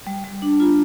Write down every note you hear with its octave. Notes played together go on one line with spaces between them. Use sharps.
G3
G3
D4
F4